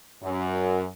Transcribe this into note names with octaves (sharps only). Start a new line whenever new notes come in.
F#2